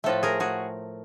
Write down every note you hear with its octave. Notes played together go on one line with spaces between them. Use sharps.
A2 F3 A3 A4 B4
G#4 A#4
F#4 G#4